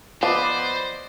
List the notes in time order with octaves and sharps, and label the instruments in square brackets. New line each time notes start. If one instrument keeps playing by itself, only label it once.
[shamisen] F3 [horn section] B3 B4 [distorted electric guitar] C5 [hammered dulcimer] D5 D#5 D6